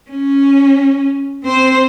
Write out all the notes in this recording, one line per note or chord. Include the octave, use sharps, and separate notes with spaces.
C#4
C4 C5